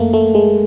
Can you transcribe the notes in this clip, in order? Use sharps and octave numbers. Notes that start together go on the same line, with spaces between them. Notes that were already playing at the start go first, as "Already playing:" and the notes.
Already playing: F#2 A3 A#3
A3
G#3